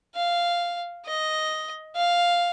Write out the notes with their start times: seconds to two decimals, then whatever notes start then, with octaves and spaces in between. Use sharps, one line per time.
0.15 F5
1.06 D#5
1.96 F5